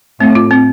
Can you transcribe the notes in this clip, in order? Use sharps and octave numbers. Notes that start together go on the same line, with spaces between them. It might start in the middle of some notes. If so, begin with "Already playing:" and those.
A2 C4
F4
C4